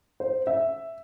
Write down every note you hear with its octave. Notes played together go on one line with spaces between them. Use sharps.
C5
E5